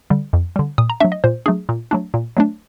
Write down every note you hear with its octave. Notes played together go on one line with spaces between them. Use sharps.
D3 G3
F2
D3 G3
A#2 D#6
A#5
F#3 A3 D4 E5
D#5
A#2 C5
F#3 A3 D4 G#4
A#2
F#3 A3 D4
A#2
F#3 A3 D4